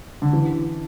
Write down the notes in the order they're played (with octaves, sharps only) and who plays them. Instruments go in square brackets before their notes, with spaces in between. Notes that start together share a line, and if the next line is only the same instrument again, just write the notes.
[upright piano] D3
E3